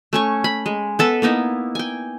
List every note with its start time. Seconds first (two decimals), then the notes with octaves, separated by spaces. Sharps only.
0.13 A3 C#4 C#6
0.44 B5
0.66 G#3
0.99 B3 A4 B4
1.22 A#3 B3 D#4 E4
1.75 G5 G#5